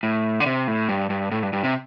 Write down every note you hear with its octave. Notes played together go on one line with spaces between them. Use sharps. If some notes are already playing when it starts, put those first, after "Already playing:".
A2
D3
C3
A2
G2
G2
A2
G2
G2
C3